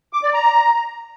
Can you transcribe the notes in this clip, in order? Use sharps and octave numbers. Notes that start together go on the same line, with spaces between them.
D6
D5
A#5